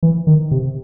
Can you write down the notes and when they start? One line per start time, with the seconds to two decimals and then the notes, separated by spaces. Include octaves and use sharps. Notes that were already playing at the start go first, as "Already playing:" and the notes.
0.03 E3
0.27 D#3
0.51 C3